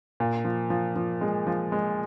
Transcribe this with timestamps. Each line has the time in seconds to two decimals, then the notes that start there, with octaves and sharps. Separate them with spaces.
0.20 A#2
0.45 F3
0.70 F3
0.96 F3
1.21 G#3
1.47 F3
1.72 G#3